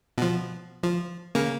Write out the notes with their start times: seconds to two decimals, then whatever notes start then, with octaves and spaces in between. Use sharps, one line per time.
0.18 B2 F3
0.83 F3
1.35 C#3 A#3